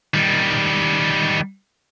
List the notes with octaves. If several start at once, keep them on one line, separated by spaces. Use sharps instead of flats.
D#3 G3